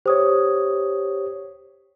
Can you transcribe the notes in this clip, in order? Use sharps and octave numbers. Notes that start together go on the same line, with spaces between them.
G4 C5 C#5 D#6